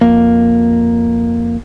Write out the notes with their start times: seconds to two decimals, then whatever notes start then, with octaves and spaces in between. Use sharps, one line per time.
0.01 F2 A#3